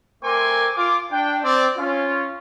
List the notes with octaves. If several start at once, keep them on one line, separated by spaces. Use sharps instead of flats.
A3 C4 A#4 G#5 C6 D6
F4 D6
D4 G5
C4 D5
C#4 F4